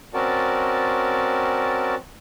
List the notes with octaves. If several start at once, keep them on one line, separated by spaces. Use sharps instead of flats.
C4 C#4 F#4 A#4 D5 A5